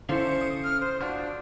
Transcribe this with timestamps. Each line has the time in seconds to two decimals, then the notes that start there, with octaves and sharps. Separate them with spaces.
0.09 D3 C#4 E4 A4 C5 F5 C#7
0.41 D#6
0.64 F6
0.81 C5
1.01 D4 F4 F#4 C5